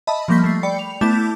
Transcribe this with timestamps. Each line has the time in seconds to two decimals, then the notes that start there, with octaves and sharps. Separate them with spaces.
0.07 D#5 E5 A5 B5
0.28 F3 G3 A#3 C#6 G6 B6
0.44 A3 C7
0.63 D5 G5 B5 C#7
0.79 F7
1.01 A3 B3 E4 A5 D6 G6